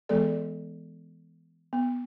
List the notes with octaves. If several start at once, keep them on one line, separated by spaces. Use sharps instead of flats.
E3 G#3 B3 G#4 A4 D5
B3